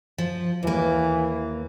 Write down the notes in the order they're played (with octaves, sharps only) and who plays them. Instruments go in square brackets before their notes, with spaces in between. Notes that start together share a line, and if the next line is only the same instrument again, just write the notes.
[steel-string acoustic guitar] F3
[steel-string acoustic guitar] D#2 A#3 [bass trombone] E3